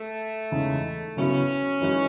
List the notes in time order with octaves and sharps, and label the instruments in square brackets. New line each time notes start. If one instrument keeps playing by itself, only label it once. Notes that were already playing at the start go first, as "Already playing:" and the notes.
Already playing: [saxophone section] A3
[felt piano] E2 C#3 G#3 D#4
[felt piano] C#3 F#3 B3 E4 [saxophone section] C#4
[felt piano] F#2 E3 G#3 D#4 F#4